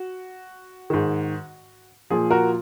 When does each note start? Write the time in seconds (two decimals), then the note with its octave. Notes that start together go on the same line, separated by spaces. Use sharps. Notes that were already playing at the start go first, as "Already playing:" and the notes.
Already playing: F#4
0.90 G#2 D#3
2.10 A#2 F3 G#4
2.31 F#4 A#4